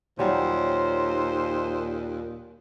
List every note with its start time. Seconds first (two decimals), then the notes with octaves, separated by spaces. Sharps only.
0.19 D#2 A#2 F#3 G3 C#4 C5